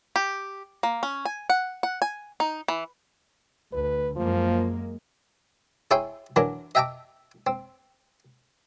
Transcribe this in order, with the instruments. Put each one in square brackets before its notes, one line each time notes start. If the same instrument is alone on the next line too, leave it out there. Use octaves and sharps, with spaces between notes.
[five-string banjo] G4
A#3
C#4
G#5
F#5
F#5
G#5
D#4
E3
[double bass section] D2 [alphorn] B4
[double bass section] F#2 G#3 A#3 [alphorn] F3
[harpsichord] E4 G#4 C#5 G5 G#5 C6
E3 F#3 D4 A#4
D#5 E5 G5 A5 A#5 D6
C4